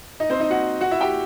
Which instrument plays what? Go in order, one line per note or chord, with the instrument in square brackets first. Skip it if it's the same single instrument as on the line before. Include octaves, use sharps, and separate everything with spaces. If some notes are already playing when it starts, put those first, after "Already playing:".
[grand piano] D#4 D#5
C4 C5
D#4 D#5
F#4 F#5
F#4 F#5
E4 E5
G4 G5